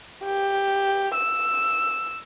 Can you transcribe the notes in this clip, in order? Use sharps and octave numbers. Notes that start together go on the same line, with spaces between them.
G4
E6